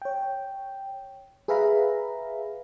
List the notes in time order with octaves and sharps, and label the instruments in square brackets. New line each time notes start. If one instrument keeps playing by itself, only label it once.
[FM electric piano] C#5 G5
G#4 B4 E5 F5 A#5 B5